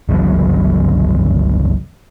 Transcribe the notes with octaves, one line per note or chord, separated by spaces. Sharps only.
G1 C#2 E3 F#3